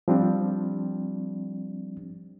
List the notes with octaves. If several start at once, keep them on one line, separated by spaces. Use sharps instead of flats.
F3 G3 C4 D4